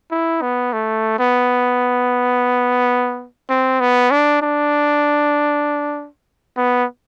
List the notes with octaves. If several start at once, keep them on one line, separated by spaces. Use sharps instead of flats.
E4
B3
A3
B3
C4
B3
D4
D4
B3